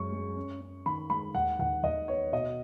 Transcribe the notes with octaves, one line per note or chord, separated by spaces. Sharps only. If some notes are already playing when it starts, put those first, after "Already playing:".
Already playing: F#2 G#3 C#4 C#6
G#3
C#4
C#4
D#3 B5
G#3 B5
D#2 F#5
D#2 F#5
D#2 D#5
B3 C#5
B2 D#5